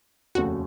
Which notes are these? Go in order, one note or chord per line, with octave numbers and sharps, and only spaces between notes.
F1 D#2 C#3 A3 F#4